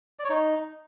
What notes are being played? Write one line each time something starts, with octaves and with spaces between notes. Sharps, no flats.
D5
C#5
D#4